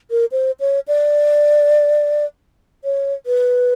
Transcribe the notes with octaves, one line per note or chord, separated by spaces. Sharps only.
A#4
C5
C#5
D5
C#5
B4